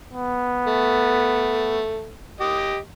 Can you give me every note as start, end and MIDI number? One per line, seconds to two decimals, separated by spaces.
0.14 1.83 59
0.67 2.17 57
2.40 2.78 67
2.40 2.78 75